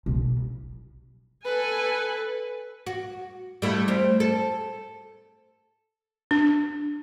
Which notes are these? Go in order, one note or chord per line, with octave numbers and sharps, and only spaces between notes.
B1
A4 B4 G#5
F#4
G3 A3 E4
G3 C4
A4
D4